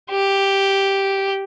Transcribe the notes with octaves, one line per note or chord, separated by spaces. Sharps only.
G4